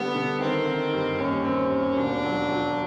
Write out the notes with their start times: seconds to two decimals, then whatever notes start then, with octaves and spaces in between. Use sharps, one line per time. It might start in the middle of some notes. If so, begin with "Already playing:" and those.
Already playing: D3 G3 B3
0.15 D3
0.41 D#3 C4
0.66 D#3
0.93 G2
1.19 D#2 C#4
1.45 C4
1.71 D#2
1.96 E1 D4
2.24 F#3
2.49 F#3